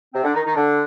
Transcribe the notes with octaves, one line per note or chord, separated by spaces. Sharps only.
C3 C4
D3 D4
D#3 D#4
D#3 D#4
D3 D4